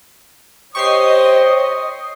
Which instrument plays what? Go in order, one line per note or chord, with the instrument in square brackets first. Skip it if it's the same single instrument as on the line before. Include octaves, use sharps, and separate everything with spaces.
[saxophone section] G4 C5 [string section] C#5 D#5 [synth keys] C#6 C7 [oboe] D#6